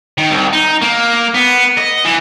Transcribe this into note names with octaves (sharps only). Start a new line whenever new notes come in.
D#3
C2
D#4
A#3
B3
D#5
E3